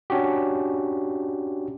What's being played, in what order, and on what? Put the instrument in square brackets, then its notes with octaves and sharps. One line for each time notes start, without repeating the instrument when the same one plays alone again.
[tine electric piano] C#4 D4 F#4 G4